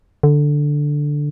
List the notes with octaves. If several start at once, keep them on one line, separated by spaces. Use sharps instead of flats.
D3